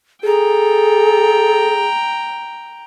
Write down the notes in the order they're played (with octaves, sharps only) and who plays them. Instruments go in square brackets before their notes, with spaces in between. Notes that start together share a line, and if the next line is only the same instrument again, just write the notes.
[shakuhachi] G#4 [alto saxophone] A4 [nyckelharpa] G5 A#5